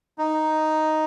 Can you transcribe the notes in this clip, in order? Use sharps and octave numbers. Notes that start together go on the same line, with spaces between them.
D#4